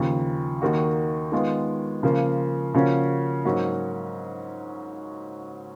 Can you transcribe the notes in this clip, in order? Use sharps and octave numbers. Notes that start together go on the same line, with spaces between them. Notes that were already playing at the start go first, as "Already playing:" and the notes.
Already playing: D#2 C#3 F3
D#2 D#3 A#3 D#4 F#4
D#3 G#3 B3 F4
C#3 F3 A#3 F4
C#3 F3 A#3 C#4 F#4
G#2 F#3 A#3 C#4 F#4